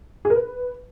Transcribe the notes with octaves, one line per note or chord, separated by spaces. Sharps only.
G#4
A#4
B4